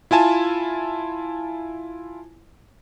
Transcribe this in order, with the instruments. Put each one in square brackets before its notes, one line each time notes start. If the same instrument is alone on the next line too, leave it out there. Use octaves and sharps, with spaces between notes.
[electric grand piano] E4 F4 G#5 A5